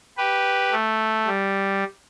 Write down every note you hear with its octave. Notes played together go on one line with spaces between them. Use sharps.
G4 B4
A3
G3